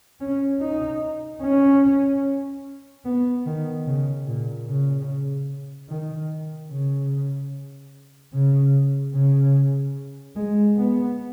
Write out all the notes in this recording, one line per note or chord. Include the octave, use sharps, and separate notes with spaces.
C#4
D#4
C#4
B3
D#3
C#3
A#2
C#3
D#3
C#3
C#3
C#3
G#3
B3